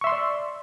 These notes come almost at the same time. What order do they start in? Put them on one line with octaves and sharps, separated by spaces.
C#6 E5 C6 E6 D5